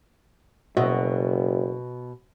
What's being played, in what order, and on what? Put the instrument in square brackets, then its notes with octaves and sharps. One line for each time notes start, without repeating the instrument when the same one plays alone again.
[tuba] F#1 [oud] B2 [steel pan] F#4 D#5 E5